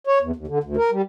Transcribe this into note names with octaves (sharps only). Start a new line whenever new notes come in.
C#5
E2
D#2
D3
D2
A#4
G3